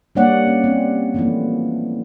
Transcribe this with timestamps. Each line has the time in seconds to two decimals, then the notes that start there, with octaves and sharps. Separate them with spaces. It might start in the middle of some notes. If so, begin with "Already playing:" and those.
0.15 G3 A#3 D4 C#5 D5 F#5
0.47 C#4
0.64 C4
1.14 E3 F3 A3 A#3 E4